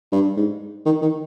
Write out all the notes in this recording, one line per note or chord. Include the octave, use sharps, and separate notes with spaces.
G2
G#2
D#3
D#3